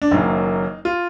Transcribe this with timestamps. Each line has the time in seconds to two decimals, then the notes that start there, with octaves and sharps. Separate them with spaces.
0.02 D4
0.11 F#1 F#2 D#3 F#3 A#3 D#4
0.85 F4